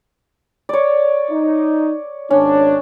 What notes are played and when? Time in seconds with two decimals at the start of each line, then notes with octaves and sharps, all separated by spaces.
0.69 C#5 D5
1.30 D#4
2.30 G#1 C#4 D4